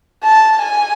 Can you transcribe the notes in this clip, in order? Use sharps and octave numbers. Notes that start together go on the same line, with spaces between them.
A5
G#5